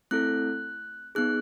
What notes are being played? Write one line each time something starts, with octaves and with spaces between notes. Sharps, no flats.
A3 C4 E4 A4 F#6
B3 D#4 G#4 F#6